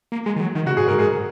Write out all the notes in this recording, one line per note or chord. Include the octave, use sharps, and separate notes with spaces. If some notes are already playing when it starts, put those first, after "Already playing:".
A#3
G#3
D#3
F#3
D#3
C#3 F#4
G#2 G#4
G#2 A#4
G#2 G#4